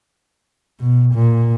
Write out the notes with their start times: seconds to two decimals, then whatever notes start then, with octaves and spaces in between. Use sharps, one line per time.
0.80 B2
1.14 A#2